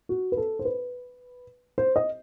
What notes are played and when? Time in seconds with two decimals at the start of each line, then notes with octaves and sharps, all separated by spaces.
0.09 F#4
0.32 B4
0.37 A4
0.59 C5
0.65 B4
1.78 C5
1.96 D#5